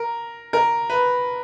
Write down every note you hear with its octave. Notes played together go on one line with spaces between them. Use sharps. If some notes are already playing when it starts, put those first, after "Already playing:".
Already playing: A#4
A#4
B4